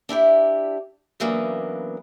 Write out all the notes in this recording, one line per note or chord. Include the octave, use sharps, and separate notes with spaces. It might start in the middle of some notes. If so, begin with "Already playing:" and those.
D4 E4 G4 D5
C#3 E3 F#3 A#3 B3 D4